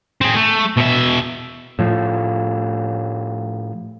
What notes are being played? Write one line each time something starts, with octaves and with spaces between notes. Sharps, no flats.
C4 G#4
A3
B2 E5
A2 F3